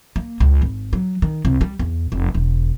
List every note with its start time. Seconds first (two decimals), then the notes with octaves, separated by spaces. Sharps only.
0.16 A#3
0.40 C#2
0.62 G#1
0.93 F#3
1.22 D#3
1.45 C2
1.61 G3
1.79 E2
2.12 F1
2.35 E1